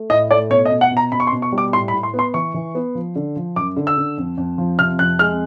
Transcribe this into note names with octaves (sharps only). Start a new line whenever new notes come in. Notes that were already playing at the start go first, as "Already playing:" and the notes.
Already playing: A3
A2 D#5
A3 D5
B2 C#5
D#5
B2
F#5
B2
A#5
B2 B5
C#6
C6
B2
C#6
G3
D6
A2 C6
B5
A2
C6
B3
C6
E3 C#6
E3
B3
F3
D3
F3
F#2 D6
D3
E6
D3
F2
F2
F3
C3 F6
F2 F#6
G#3 F6